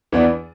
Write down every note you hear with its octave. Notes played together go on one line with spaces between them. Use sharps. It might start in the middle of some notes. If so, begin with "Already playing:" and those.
E2 E3 B3 D4